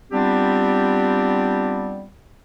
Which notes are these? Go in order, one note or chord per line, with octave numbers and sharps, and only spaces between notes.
G3 B3 C4 D4 F4 G4